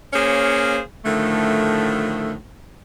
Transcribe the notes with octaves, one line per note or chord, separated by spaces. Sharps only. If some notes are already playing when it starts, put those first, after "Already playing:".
A#3 C#4 G#4 C5 C#5 F5
A2 D3 D#3 F3 A3